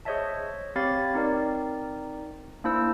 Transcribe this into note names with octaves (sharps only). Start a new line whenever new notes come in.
G#4 C5 C#5 D#5 E5 A5
C4 G4 C#5 F5 B5 A6
C4 D#4 A#4 D5
A#3 D4 E4 C5 E6